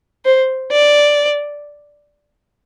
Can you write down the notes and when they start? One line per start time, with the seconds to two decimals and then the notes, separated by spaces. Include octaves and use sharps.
0.25 C5
0.71 D5